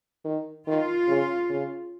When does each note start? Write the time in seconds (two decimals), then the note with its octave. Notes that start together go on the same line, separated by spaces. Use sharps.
0.25 D#3
0.67 D#3 F4
1.08 C#3
1.50 C#3